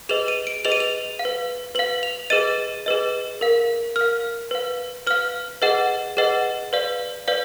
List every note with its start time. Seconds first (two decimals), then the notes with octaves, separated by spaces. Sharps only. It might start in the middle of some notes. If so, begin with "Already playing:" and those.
0.09 G#4 B4 D#5 F7
0.28 D#7
0.47 D7
0.65 G#4 B4 D#5 F7
0.72 D#7
0.80 F7
1.19 F5
1.25 B4
1.75 B4 F5 F#7
2.03 F7
2.30 G#4 B4 D#5 D#7
2.86 G#4 B4 D#5
3.41 A#4 F5
3.96 A#4 F5 F6
4.51 B4 F5
5.07 B4 F5 F6
5.62 G#4 B4 D#5 F#5
6.17 G#4 B4 D#5 F#5
6.73 B4 D5 F5
7.28 B4 D5 F5